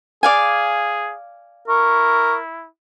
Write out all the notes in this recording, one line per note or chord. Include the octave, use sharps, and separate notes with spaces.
G#4 D5 F5 G#5
E4 A#4 C#6